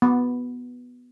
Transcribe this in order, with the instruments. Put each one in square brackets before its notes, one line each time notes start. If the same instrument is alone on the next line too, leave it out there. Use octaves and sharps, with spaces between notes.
[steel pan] B3